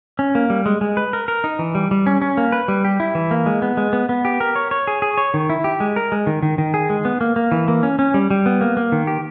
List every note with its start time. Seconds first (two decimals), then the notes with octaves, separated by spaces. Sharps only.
0.19 C#4
0.35 A#3
0.50 G3
0.66 G#3
0.81 G#3
0.97 B4
1.13 A#4
1.28 A#4
1.44 D#4
1.59 E3
1.75 G3
1.91 G3
2.06 C#4
2.22 C#4
2.37 A#3
2.52 B4
2.68 G3
2.85 G4
3.00 E4
3.15 E3
3.31 A#3
3.46 G#3
3.62 B3
3.77 G#3
3.93 B3
4.09 B3
4.25 G4
4.40 A#4
4.56 C#5
4.71 C#5
4.87 G#4
5.02 G#4
5.18 C#5
5.34 D#3
5.50 E4
5.64 G4
5.80 G#3
5.96 A#4
6.12 G#3
6.27 D#3
6.43 D#3
6.58 D#3
6.74 G#4
6.90 G#3
7.05 B3
7.21 A#3
7.36 A#3
7.52 E3
7.68 A#3
7.83 C#4
7.99 C#4
8.14 G3
8.31 G3
8.46 B3
8.61 A#3
8.77 A#3
8.92 D#3
9.07 G4